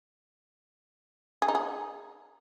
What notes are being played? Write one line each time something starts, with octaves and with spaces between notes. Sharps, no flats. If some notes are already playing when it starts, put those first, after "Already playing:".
G#4
D#4
G#4